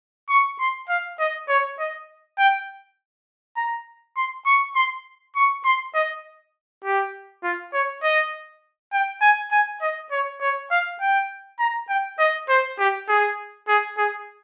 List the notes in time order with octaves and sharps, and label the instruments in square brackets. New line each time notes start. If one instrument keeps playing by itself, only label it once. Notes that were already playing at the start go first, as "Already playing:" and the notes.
[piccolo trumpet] C#6
C6
F5
D#5
C#5
D#5
G5
A#5
C6
C#6
C6
C#6
C6
D#5
G4
F4
C#5
D#5
G5
G#5
G#5
D#5
C#5
C#5
F5
G5
A#5
G5
D#5
C5
G4
G#4
G#4
G#4